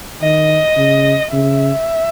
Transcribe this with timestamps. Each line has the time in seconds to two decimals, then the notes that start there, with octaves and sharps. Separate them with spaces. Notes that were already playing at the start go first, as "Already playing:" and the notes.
0.22 D#3 D#5
0.77 C#3
1.32 C#3 E5